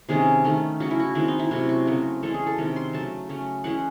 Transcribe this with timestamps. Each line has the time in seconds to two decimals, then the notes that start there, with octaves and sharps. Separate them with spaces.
0.09 C3 D#3 G#3 C#4 G#4
0.44 D#3 A3 C#4
0.80 C#3 F#3 C#4 F#4
0.91 E4
1.00 F#4
1.15 D#3 G#3 C4 E4
1.28 D#4
1.39 E4
1.51 C3 F#3 A3 C#4 F#4
1.69 F#4
1.87 C#3 F#3 A3 C4
2.23 E3 G#3 C#4 A4
2.34 G#4
2.46 A4
2.58 C3 D#3 G#3 C#4
2.76 C6
2.93 C#3 F#3 A3 A5
3.29 C#3 F#3 A3 C#4
3.64 C#3 E3 G#3 C#4 F#5